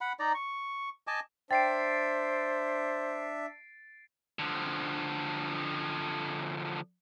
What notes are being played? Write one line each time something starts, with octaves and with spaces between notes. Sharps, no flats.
F#5 B5
D#4 D5 A#5
C#6
D#5 G#5 A5 D6
D4 C5 E5 G5 A6 C7 D7
D3 F3